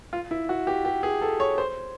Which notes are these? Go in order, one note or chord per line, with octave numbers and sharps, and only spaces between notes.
F4
E4
F#4
G4
G4
G#4
A4
C#5
C5